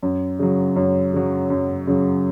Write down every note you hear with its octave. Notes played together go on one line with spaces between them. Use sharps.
F#2
C#3 F#3
F#2
C#3 F#3
F#2
C#3 F#3